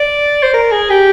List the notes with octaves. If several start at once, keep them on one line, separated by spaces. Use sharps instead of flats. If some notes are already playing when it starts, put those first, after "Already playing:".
Already playing: D5
C5
A#4
G#4
G4